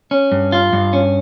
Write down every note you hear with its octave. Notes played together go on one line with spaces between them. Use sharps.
C#4
G2
F4
G2
C#4